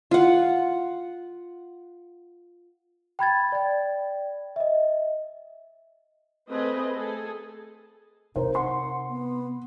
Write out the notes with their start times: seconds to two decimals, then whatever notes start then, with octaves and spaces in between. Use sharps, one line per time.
0.11 F4 F#5
3.19 G5 B5 G#6 A6
3.52 D5 G5
4.56 D#5 E5
6.49 A3 C4 G#4 B4 D#5
6.94 G#4 A4
8.36 C3 D#4 A#4 C5
8.55 F#5 C6
9.10 B3